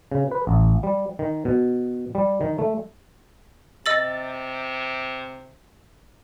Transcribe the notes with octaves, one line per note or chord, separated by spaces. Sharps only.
C#3
B4
A1
G3
D#3
B2
G3
D#3
A3
C3 D#5 E6 A6 F#7